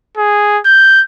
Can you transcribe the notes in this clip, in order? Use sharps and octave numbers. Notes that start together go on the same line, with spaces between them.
G#4
G6